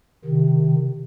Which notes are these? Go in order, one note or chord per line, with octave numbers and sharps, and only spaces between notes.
C3 D#3